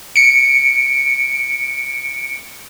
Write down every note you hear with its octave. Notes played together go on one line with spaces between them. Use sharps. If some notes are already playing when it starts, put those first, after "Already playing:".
C#7 D7